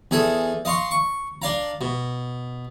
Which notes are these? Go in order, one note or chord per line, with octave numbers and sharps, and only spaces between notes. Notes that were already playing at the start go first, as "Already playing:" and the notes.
E2 G#4 A4 D#6
D#5 F5 C6 C#6
C#6
D4 F5 A#5
B2